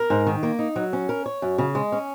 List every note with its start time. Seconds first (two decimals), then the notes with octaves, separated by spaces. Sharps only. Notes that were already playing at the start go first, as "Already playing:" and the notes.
Already playing: A#4
0.10 G#2
0.27 D#3
0.43 A#3
0.59 D#4
0.76 F#3
0.93 C#4
1.09 A#4
1.26 C#5
1.42 F#2
1.58 C#3
1.75 G#3
1.92 C#4